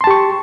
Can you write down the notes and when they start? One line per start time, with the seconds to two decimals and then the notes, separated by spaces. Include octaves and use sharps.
0.01 C6
0.04 A5
0.07 G4
0.11 C#6